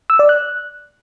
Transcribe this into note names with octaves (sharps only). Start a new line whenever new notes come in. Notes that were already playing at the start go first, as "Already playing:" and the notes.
E6
D5
F#6